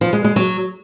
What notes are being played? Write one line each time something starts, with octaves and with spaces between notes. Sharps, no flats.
F3
G#3
G#3
F#3